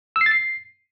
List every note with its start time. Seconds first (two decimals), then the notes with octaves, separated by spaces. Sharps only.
0.16 E6
0.21 C7
0.26 A6
0.31 C7